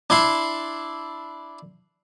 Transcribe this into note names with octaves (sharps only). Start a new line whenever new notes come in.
D4 E4 C6